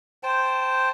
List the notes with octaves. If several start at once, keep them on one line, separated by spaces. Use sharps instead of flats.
C5 G5 A5